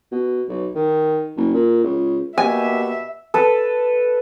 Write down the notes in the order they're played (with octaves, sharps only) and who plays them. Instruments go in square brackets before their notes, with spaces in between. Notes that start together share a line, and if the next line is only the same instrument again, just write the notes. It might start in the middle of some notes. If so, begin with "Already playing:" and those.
[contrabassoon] B2
B1
D#3
F#1
A#2
C#2
[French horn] B2 [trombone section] A#3 G4 [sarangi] E5 [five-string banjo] G#5
[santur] A4 B4